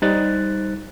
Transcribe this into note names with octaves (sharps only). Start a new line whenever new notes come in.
G3 D#4 C5 F#6 A6